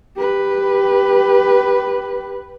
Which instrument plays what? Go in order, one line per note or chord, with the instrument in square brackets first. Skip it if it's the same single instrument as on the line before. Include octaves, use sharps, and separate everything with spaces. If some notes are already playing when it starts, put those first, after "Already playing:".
[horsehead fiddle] G4 B4